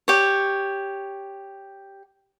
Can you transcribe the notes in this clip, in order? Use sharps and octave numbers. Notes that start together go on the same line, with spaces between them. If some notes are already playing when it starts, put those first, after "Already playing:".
G4 C#5